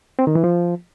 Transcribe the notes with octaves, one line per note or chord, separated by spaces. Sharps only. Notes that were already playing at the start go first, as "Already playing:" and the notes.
C4
D#3
E3
F3